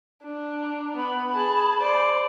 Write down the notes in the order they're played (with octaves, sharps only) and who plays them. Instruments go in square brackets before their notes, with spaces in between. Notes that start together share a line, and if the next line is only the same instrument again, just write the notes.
[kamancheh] D4
[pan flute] A#5
[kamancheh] B3 [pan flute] B5
[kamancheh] G#4 A5
C5 D5